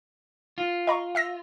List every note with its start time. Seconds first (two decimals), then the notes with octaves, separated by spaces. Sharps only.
0.58 F4
0.87 D#5 A#5 C#6
1.15 E5 E6 A#6